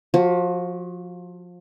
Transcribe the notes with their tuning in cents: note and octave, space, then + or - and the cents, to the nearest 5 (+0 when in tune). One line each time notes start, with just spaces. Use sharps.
F3 +25 F#4 +5